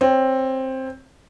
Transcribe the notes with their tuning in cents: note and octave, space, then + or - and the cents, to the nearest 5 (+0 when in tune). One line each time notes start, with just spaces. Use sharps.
C4 +10 C#5 +0